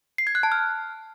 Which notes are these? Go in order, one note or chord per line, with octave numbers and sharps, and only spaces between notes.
C7
G#6
F#6
A5
F6